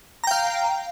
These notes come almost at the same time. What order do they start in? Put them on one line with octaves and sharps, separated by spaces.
A#5 G5 F5